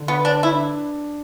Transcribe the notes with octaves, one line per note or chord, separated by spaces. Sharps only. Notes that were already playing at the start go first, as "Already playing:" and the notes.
Already playing: D3
B3 B4
D4
D4 E4